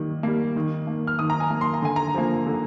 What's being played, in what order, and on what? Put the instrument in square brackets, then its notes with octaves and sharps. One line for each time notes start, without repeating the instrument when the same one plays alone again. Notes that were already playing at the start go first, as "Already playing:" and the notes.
Already playing: [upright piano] D#3 G3 A#3
G3 A#3
D#3
A#3
F6
D#3 D#6
A#5
G#5
A#3
C6
A#5
D3 G#5
A#5
F3 A#3
D3